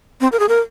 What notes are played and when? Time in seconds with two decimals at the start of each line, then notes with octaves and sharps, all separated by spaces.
0.21 C4
0.32 A#4
0.39 G#4
0.49 A#4